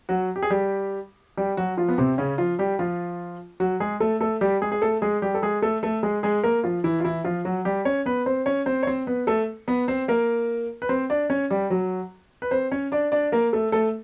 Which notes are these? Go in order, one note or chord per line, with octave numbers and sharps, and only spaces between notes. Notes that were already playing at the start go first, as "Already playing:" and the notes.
F#3 F#4
G4
G#4
G3 G4
G3 G4
F#3 F#4
F3 F4
B3
C3 C4
C#3 C#4
F3 F4
G3 G4
F3 F4
F#3 F#4
G#3 G#4
A3 A4
A3 A4
G3 G4
G#3 G#4
G#4
A3 A4
G#3 G#4
G3 G4
A4
G#3 G#4
A3 A4
A3 A4
G#3 G#4
G#3 G#4
A#3 A#4
F3 F4
E3 E4
F4
E3 E4
F3 F4
F#3 F#4
G3 G4
C#4 C#5
B3 B4
C4 C5
C#4 C#5
C4 C5
C#5
C4 C5
B3 B4
A3 A4
B3 B4
C4 C5
A#3 A#4
B4
C4 C5
D4 D5
C#4 C#5
G3 G4
F#3 F#4
B4
C4 C5
C#4 C#5
D4 D5
D4 D5
A#3 A#4
A3 A4
A3 A4